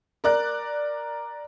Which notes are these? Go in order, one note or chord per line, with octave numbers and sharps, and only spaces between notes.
A#4 D5 F#6